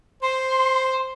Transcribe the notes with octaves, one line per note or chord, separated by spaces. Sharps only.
C5 C6